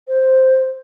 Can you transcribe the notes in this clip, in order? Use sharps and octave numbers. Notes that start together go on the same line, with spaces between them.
C5